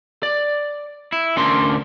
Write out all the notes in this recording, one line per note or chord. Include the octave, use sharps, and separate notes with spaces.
D5
E4
D2 C#4 D4 A#4 C6